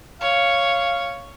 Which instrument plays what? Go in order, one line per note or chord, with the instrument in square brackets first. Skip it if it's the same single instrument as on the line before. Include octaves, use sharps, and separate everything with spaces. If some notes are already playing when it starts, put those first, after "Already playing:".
[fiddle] C#5 [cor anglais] F5